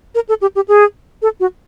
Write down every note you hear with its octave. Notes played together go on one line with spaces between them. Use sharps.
A#4
A4
G4
G4
G#4
A4
F#4